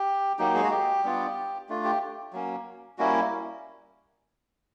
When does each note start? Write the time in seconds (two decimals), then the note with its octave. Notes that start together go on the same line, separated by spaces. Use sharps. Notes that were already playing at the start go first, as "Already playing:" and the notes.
Already playing: G4
0.39 F#3 A#3 D#4 G4
0.54 G#3 G#4
0.64 F#4
0.71 G4
1.03 G3 B3 D4 F4
1.69 A3 D4 F4
1.84 G4
2.33 F#3 A#3 C#4
2.98 G3 A#3 C#4 E4 F#4